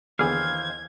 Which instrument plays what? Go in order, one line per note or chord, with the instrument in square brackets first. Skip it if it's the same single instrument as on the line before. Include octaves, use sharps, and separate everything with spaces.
[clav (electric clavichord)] D#2 E3 [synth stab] D3 B3 G#4 [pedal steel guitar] C5 F5 [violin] G#6